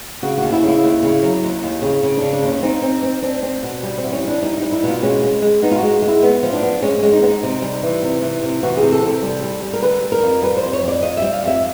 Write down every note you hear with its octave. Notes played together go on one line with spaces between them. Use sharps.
C#3 F#4
D#2 F#4
E4
C#3
E4
D#2
C#3
F#3
D#2
D#2
C#3
C#3
C#3 D4
D4
D#2 C#4
C4 D#4
C4
C4
C4 D4
C4
B2
G3
C4
E2
C#4
G3
D4
G3 D#4
G3 D#4
E4
B2
F4
G#3 C#4
G#3
G#3
B3 D#4
F4
G#3 F#4
G#3
E4
B3
F3
D4
B3
G#3 C#4
G#3 C#4
D#4
B3
D#4
C3
G3
E3
C3
E3
C3
E3 F#4
G#4
C3
A4
C3
A4
G3
G3
G3
A#4
D3 B4
G3
A#4
F2
G3 B4
C5
F2
C#5
F2 D5
F2 D#5
G3 E5
F5
F2 E5